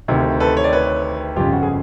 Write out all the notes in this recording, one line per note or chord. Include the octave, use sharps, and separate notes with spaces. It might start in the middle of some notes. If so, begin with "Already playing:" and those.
D2 C3 D#3
A4 B4
C#5
D5
B4 C#5
G1 F2 C#3 F4 G4
F#4
G#4